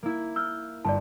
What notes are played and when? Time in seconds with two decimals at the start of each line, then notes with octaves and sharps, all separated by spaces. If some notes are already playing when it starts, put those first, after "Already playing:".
0.03 A#3 E4
0.36 E6 F6 G6
0.85 G1 D5 A5